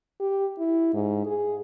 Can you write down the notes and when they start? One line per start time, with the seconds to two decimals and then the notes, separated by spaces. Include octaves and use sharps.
0.21 G4
0.59 E4
0.94 G#2
1.26 G#4